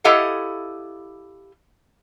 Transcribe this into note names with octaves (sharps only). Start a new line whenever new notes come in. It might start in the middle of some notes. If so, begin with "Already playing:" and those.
E4 G4 A4 D#5 F5 F#5